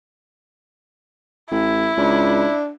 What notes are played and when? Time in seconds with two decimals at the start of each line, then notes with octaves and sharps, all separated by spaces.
1.51 A1 E4
1.98 C#2 D4